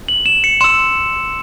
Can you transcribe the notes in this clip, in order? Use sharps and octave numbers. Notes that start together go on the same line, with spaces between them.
F#7
E7
C#7
C6 E6 E7